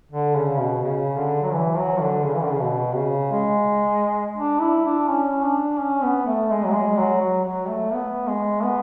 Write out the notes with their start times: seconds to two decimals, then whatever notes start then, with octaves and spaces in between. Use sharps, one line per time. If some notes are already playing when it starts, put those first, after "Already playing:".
0.12 D3
0.36 C#3
0.59 B2
0.83 C#3
1.18 D3
1.43 F#3
1.54 E3
1.78 F#3
2.01 D3
2.25 C#3
2.36 E3
2.43 D3
2.53 C#3
2.61 B2
2.96 C#3
3.32 G#3
4.38 D4
4.61 E4
4.85 D4
5.09 C#4
5.44 D4
5.80 C#4
6.03 B3
6.27 A3
6.51 G#3
6.65 F#3
6.74 G#3
6.98 F#3
7.22 F#3
7.45 F#3
7.68 A3
7.93 B3
8.28 G#3
8.63 B3